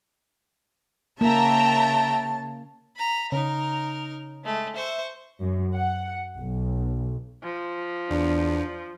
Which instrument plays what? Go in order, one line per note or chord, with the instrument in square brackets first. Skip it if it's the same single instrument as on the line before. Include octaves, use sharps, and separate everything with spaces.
[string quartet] C#3 A5 [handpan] A#3 [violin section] E5 G5 A#5
[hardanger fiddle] A#5 B5
[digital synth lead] C#3 [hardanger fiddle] D#4 A#4
[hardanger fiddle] G#3 A3
[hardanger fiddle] C5 C#6 [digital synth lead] E5
[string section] F#2
F#5
B1
[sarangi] F3
[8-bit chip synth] E2 [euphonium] D4